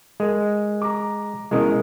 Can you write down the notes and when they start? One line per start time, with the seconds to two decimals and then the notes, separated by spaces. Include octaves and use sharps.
0.20 G#3 A#4
0.82 A#5 D6
1.51 B2 G#3 C#4 E4 A#4 D#5